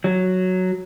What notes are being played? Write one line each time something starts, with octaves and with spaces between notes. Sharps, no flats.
F#3